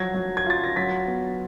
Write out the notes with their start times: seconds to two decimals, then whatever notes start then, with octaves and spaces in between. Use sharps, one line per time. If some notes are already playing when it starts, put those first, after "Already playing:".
Already playing: F3 F#3 G#6 A#6
0.14 F#3
0.37 G#6
0.46 F4 A6
0.64 A#6
0.76 F#3 A6 B6
1.07 B3